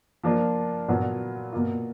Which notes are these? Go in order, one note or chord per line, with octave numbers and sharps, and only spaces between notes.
F3 A#3 D4 F4
A#2 F#3 B3 F4
B2 A#3 F4